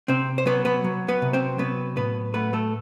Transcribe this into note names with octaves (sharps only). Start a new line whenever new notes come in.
C3 C4 C5
C5
F#3 B3 B4
B3 B4
F#3
B3 B4
C3
C4 C5
F#3 B3 B4
A2 B3 B4
A3 B3 B4
A3 A4